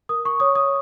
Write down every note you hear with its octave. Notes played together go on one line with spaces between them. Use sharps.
A#4 D#6
C#6
C#5 D#6
D#6